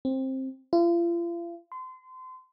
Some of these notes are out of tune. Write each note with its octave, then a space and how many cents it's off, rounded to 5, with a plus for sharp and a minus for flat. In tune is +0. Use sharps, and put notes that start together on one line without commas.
C4 +15
F4 -40
C6 -30